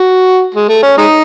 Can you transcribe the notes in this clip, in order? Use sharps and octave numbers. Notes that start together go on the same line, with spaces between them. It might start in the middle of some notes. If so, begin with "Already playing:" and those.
Already playing: F#4
G#3
A3
C#4
G#3 D#4